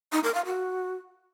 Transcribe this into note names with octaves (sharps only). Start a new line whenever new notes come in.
D#4
A#4
F5
F#4